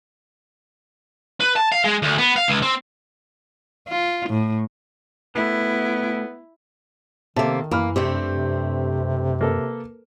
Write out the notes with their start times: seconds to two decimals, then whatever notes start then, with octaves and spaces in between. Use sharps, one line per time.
1.40 B4
1.56 A5
1.72 F5
1.84 G#3
2.02 D2
2.18 B3
2.36 F5
2.48 C#2
2.62 C4
3.88 F4
4.29 A2
5.35 B2 A3 B3 E4
7.36 C3 D#3 A#3 A4 E5 A5
7.71 F#2 E3 A#3 B5 F6
7.96 G2 C3 A3 C4 G4
8.29 C3
9.41 A#3 A4 B4